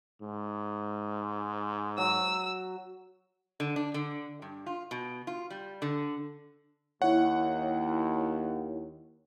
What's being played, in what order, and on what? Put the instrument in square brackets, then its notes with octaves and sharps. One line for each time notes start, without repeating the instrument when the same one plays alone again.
[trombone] G#2
[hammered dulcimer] F#3 [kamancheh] E6
[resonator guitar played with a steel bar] D3
D4
D3
G2
F4
B2
F4
G3
D3
[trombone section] D#2 [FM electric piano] E4 C#5 [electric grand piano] F#5